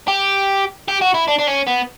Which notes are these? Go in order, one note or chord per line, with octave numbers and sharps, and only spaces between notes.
G4
G4
F#4
E4
D4
D4
C#4
B3